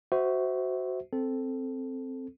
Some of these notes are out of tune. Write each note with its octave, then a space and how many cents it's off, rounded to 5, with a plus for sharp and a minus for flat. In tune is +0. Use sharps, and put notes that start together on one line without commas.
F#4 +10 C5 -15 E5 -25
C4 +0 A4 +0